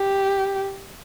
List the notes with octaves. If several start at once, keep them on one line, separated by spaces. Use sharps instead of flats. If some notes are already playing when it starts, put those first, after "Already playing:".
Already playing: G4